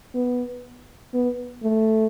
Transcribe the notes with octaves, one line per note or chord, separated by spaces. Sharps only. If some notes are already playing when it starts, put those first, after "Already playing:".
B3
B3
A3